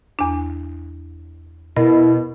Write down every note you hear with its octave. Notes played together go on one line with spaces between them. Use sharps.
E2 D4
B2 E4 A#4